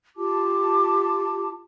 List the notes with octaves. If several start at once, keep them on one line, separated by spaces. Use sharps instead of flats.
F4 G4 A5 D6